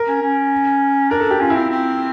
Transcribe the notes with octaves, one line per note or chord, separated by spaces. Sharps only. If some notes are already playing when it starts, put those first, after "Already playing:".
Already playing: A#4
C#4
C#4
D4 A#4
A4
G4
C#4 F4
E4
C4
C4